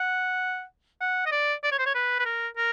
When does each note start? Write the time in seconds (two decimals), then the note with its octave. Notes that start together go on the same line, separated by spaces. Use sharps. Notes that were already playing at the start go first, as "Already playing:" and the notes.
Already playing: F#5
1.01 F#5
1.26 D#5
1.32 D5
1.64 D5
1.72 C#5
1.79 C5
1.86 C#5
1.95 B4
2.19 B4
2.25 A#4
2.57 A#4